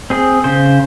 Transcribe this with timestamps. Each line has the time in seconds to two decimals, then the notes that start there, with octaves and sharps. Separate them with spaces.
0.10 C4 G#4
0.44 C#3 C5